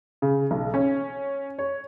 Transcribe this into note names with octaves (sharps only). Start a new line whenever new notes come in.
C#3
B1
C#4
C#5